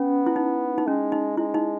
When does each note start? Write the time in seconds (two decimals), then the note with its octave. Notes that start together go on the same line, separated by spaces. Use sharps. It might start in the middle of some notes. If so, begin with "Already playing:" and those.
Already playing: B3 C#4
0.26 E4
0.36 D#4
0.78 D#4
0.87 G#3 C#4
1.12 D#4
1.37 G#3 E4
1.54 D#4